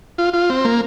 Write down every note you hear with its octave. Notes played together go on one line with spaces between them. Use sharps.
F4
F4
C4
A#3